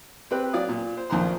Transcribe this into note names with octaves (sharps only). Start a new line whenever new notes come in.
C4 G4 B4
F#3 D5 F5 D#6
A#2
C5
A#1 F2 D#3 C5 A#5 C6